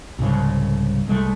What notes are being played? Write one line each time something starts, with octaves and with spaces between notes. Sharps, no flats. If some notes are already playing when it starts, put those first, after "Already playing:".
C2 G#2 C#3
C2 G#3 A3